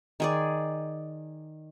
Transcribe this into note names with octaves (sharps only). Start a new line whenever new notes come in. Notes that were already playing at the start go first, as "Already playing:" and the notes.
D#3 G#4 D5